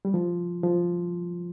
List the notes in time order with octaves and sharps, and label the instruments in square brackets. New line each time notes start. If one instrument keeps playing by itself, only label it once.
[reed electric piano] G3
F3
F3